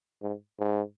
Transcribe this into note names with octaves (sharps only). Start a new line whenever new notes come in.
G#2
G#2